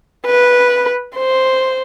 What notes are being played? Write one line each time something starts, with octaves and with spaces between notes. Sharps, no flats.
B4
C5